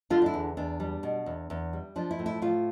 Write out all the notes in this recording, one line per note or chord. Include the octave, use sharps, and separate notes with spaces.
D3 F4
D4
E4
E2
E2 D4
G3
B2
E2
E2
G3
F3 D4
E4
A2
E4
A2 F4